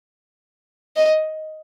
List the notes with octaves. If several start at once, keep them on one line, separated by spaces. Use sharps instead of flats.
D#5